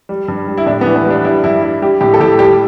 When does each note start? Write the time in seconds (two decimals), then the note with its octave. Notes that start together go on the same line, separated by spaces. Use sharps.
0.09 G3
0.28 G2
0.47 G3
0.58 E4
0.66 A2 D4
0.81 B3
0.86 E3
0.96 B3
1.05 G3
1.10 D4
1.24 G3 E4
1.44 G2 E4
1.62 G3 E4
1.82 G3 G4
2.01 A2 G4
2.14 A4
2.20 A2 G4
2.39 G3 G4